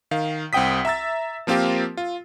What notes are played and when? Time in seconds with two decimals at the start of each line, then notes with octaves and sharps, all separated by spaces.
0.11 D#3 F5
0.53 C2 C4 F#5 G5 D#6 B6
0.85 E5 A#5 E6 A6
1.47 F3 A#3 C4 F4 G4 A#4
1.97 F4